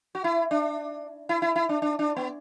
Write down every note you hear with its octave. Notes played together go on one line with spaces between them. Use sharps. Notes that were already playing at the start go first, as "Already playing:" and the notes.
F#4
E4
D4
E4
E4
E4
D4
D4
D4
B3